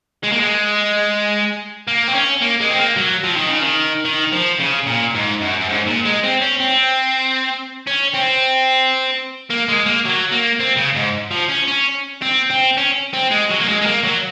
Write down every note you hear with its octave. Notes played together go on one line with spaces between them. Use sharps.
G#3
A#3
G#3
A#3
C4
C#4
A#3
G#3
C4
A#3
F#3
F3
D#3
C#3
D#3
D#3
F3
C#3
A#2
G#2
F#2
F#2
G#2
A#2
G#3
C4
C#4
C4
C#4
C4
A#3
G#3
A#3
F#3
A#3
C4
C#3
G#2
F3
C#4
C#4
C4
C4
C#4
C4
G#3
F#3
A#3
G#3
G#3
A#3
F#3